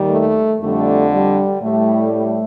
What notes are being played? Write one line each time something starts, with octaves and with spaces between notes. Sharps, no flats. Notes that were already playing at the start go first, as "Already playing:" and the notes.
Already playing: D#2 D#3 G3
A3
F2 D3 G3 A3
G3
A2 G3 A3
A3